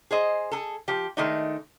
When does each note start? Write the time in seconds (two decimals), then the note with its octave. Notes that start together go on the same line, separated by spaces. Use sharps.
0.11 G#4 C5 D#5
0.51 G#4 A4
0.88 F3 G4
1.17 D#3 G#3 A3 D4 D#4